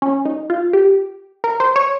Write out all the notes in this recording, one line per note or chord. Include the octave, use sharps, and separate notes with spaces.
C#4
D#4
F4
G4
A#4
C5
C#5